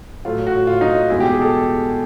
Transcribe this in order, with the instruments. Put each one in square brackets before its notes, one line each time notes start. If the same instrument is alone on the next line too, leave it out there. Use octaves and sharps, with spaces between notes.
[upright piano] A2 F#3 A3 F4
F#4
F4
D#4
E2 B2 G#3 E4
G4
G#4
A4